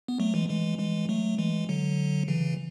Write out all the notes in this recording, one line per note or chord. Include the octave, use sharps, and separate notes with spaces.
B3
F#3 A3
E3 G#3
E3 G#3
E3 G#3
F#3 A3
E3 G#3
D3 F#3
C#3 E3